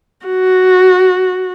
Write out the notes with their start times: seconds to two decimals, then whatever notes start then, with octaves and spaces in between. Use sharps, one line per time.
0.26 F#4